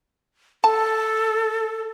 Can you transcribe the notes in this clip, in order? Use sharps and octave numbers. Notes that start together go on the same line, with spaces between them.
A4 A5